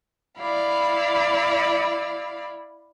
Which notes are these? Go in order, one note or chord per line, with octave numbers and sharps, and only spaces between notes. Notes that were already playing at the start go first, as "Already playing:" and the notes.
E4 D5 F5 B5